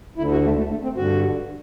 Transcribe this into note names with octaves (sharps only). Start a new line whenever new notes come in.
D2 D3 E4
F#4
A3
A3
A3
C4
G2 D3 F#4